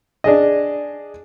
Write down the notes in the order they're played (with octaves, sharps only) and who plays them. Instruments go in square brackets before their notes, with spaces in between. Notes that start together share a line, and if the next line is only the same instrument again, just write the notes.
[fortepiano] D4 G#4 D#5